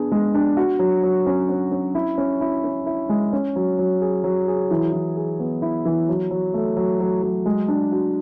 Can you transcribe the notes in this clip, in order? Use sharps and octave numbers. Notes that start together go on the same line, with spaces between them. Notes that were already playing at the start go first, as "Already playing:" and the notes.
Already playing: B3 D4 G#4
G#3
D4
F#4
F#3
F#3
C#4
C#4
C#4
E4
C#4
E4
C#4
E4
G#3
C#4
F#3
F#3
G#4
F#3
G#4
E3
E3
G#4
B3
E4
E3
F#3
F#3
A3
F#3
F#3
F#3
G#3
D4
F#4